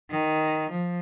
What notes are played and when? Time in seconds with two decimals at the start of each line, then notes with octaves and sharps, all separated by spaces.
0.10 D#3
0.71 F3